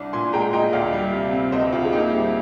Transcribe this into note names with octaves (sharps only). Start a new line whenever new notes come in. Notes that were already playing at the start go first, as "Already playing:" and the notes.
Already playing: C2 D4
A#2 G#5 C6
G#3 G5 A#5
A#2 D#5 G5
D2 D5 F5
G3
C3
C4
D2 C5 D#5
D2 F4
G#4
A#3 D#4 G4
G3